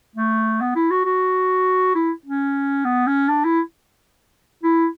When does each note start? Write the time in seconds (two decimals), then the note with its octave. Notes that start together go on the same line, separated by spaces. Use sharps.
0.16 A3
0.61 B3
0.76 E4
0.91 F#4
1.05 F#4
1.95 E4
2.26 C#4
2.85 B3
3.07 C#4
3.29 D4
3.44 E4
4.63 E4